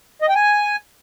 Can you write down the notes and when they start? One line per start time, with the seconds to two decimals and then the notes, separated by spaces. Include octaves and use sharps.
0.22 D#5
0.29 G5
0.35 G#5